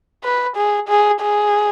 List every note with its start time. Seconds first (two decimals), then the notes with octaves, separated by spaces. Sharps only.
0.24 B4
0.57 G#4
0.89 G#4
1.21 G#4